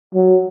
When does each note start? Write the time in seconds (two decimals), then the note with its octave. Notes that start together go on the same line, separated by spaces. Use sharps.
0.15 F#3